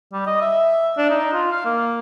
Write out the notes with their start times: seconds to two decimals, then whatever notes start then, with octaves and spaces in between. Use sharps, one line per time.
0.13 G3
0.26 D#5
0.41 E5
0.97 D4
1.10 D#4
1.33 F4
1.52 F5
1.65 A#3